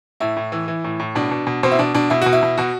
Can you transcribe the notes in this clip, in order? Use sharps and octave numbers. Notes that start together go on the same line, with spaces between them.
A2 E4
A2
E3
E3
A2
A2
B2 D4
B2
B2
B2 C4
E4
B2 D4
B2 D4
B2 E4
B2 F#4
E4
B2
B2 F#4